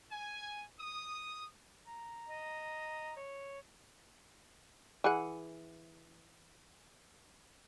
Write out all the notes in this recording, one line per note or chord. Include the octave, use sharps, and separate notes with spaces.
G#5
D#6
A#5
D#5
C#5
E3 G#4 F#5